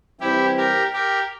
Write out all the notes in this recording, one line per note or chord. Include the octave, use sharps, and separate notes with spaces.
C3 E3 G3 C4 E4 G4
G4 A#4
G4 A#4